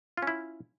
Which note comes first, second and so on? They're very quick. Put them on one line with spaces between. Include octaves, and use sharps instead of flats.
F4 C#4 E4